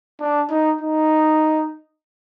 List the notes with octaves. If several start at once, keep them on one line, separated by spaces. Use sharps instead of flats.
D4
D#4
D#4